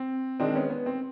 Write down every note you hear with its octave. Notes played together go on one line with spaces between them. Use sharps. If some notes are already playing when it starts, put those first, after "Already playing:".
Already playing: C4
D#3 G#3 C4 D4
B3 C#4
B3
C4